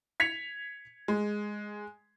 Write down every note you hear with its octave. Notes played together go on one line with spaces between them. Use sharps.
G#6 B6 C#7 F7
G#3